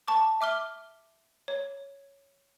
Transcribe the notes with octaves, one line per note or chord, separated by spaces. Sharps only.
A5 C#6 D6
E5 D6 F6 G7
C#5